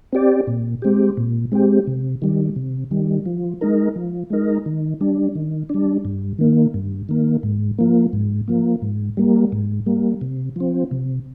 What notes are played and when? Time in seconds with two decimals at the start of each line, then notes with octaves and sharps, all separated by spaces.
0.13 C4 G4 D5
0.47 A#2
0.82 G#3 C4 G4
1.17 A#2
1.52 G#3 C4 G4
1.87 C3
2.22 D#3 G3
2.56 C3
2.91 D#3 G3
3.26 F3
3.61 G#3 D#4 A#4
3.96 F3
4.30 G#3 D#4 A#4
4.66 D#3
5.01 G3 D4
5.35 D#3
5.69 G3 D4
6.05 G2
6.39 D#3 A#3
6.74 G2
7.09 D#3 A#3
7.43 G#2
7.78 F3 A#3
8.13 G#2
8.48 F3 A#3
8.82 G#2
9.17 G3 A#3
9.52 G#2
9.86 G3 A#3
10.21 C3
10.56 F3 C4
10.91 C3